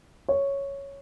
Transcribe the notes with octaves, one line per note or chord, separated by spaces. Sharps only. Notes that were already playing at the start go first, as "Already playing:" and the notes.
C#5